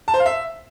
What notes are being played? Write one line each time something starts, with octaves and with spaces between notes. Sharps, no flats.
A5
C5
F5
E5